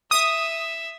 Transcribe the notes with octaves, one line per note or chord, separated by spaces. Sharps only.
E5 D#6